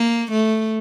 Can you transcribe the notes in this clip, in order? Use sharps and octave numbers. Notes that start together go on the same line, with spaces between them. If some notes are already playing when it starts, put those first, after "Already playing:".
Already playing: A#3
A3